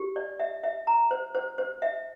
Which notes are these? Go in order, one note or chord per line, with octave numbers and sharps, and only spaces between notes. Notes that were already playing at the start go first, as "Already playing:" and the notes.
Already playing: G4
D5
E5
E5
A#5
C5
C5
C5
E5